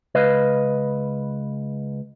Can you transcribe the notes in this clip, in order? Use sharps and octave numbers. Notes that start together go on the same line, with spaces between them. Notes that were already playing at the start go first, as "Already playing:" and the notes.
C#2 B4 D#5 F5